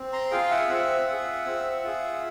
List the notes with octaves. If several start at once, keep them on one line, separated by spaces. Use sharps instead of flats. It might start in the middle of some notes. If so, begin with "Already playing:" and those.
Already playing: C4
A#5 C6
F4 G#4 F5 G5
E5 F#5
C4 E5 F#5
F4 G#4
C4
F4 G#4